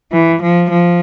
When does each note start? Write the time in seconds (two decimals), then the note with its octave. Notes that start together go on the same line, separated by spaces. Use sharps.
0.12 E3
0.42 F3
0.70 F3